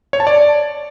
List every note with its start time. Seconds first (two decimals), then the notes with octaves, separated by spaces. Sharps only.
0.13 C#5
0.20 A5
0.27 D5